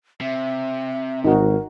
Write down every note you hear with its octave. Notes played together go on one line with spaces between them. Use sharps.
C3 E5
G#1 D#4 F#4 A#4